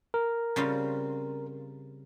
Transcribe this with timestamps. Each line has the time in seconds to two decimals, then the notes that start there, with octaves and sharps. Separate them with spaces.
0.14 A#4
0.56 C#3 G3 C4 F4